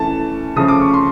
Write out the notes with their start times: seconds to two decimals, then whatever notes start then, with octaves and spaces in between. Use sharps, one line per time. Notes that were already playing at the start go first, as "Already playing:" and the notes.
Already playing: E3 A3 C#4 A5
0.56 C#3 F3 A3 C#4 D#6
0.68 D6
0.81 C#6
0.94 C6